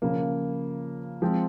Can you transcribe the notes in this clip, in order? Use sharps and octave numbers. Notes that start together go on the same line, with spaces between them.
C#3 F3 A#3
F3 G#3 C4